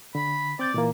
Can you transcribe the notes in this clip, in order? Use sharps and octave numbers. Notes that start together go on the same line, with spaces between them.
D3 B5
C4 D5 G6 A6
A#2 E3 A#3